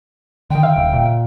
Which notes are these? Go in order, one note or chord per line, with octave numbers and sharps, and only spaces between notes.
D3 D#3 G5
E5 F5
D#1 C#3
A#2